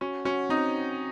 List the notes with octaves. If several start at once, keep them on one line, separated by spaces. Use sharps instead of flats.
C#4 F#4
C#4 F#4
C4 D#4